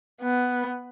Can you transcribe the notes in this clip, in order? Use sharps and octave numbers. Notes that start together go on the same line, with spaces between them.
B3